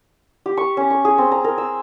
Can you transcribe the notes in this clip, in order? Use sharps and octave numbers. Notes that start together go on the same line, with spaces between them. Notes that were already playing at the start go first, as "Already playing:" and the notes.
G4
C#6
C#4
C#6
G#4
C4
A#5
A#4
E6